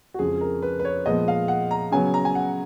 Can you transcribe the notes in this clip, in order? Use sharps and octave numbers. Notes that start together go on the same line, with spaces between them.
F#4
F2 C#3 F3 G#3 G#4
A#4
B4
B4
C#5
A#2 F3 G#3 B3 D#5
F5
F#5
A#5
C#3 F#3 B3 G#5
A#5
G#5
F#5